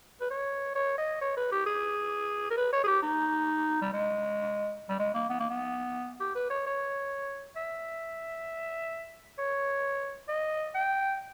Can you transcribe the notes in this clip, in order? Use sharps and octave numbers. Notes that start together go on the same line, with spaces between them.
B4
C#5
C#5
D#5
C#5
B4
G4
G#4
A#4
B4
C#5
G#4
G4
D#4
G3
G#3
G3
G#3
A#3
B3
A#3
B3
G4
B4
C#5
C#5
E5
C#5
D#5
G5